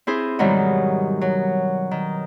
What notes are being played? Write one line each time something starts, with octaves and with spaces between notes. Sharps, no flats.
C4 E4 G#4 C5
G#2 B2 D#3 F#3 G3
F#3
D#3